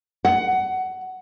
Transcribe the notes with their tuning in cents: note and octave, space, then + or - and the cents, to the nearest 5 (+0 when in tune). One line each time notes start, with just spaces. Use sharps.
F#5 +15